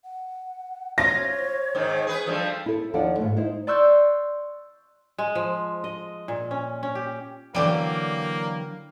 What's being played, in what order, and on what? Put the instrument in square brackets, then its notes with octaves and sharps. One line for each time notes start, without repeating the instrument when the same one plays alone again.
[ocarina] F#5
[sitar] F4 [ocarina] C5 [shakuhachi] C#5 [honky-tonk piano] A#6
[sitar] G#2 D#3
G#4 B4
G2 F3 A3
[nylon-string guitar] E4 A4
D#2 F3 D4 A4 D5 F#5
G#2 B2 A3
D#4 E4 C5
[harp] D5 C6 C#6 E6 F#6 G6
[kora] G#3
F3
D#5
A#2
C#4
C#4
G4
[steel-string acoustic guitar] D3 E3 F#3 [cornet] A#3 [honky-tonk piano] D5 G5 D6